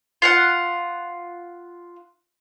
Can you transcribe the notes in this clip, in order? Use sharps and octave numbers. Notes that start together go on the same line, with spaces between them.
F4 F5 F#5